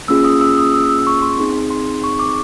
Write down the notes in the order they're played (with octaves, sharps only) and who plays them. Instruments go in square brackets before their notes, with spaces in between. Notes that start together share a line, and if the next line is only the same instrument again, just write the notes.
[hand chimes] A#3 C#4 F4 G#4 E6
D#6
E6
D#6
E6
E6
C#6
C6
C4 D#4 G#4
C6
C#6
D6